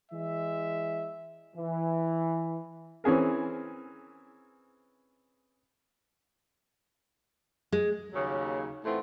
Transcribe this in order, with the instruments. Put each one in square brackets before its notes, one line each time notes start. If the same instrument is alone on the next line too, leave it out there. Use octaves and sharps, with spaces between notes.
[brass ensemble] E3 G#3 E5
[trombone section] E3
[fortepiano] E3 C4 C#4 G#4 A#4
[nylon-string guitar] G#3 [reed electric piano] G#4
[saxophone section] D#2 C#3 F#3
A2 E3 A3 B3 C4 F4